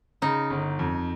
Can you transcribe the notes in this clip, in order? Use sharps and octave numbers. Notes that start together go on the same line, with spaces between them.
C#3 D#4
G1
F2